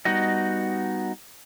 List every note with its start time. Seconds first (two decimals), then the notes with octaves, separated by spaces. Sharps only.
0.05 G3 B3 D#4 F#4 D#5